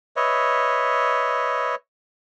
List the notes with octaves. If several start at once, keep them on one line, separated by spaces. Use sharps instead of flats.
B4 C#5 D#5 E5